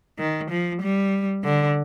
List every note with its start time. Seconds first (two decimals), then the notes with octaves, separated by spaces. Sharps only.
0.19 D#3
0.51 F3
0.82 G3
1.44 D3